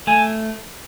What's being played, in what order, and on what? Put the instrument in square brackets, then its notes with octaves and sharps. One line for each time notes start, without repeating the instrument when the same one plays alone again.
[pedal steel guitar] A3 [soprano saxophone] G#5